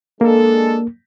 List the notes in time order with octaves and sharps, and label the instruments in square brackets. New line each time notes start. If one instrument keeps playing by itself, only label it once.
[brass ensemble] G#3 D4 A4 [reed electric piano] A#3